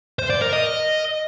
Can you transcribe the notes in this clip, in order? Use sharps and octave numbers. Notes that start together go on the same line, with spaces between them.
C5
D5
A#4
D#5